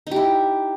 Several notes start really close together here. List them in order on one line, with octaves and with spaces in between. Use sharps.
D#4 G4 E4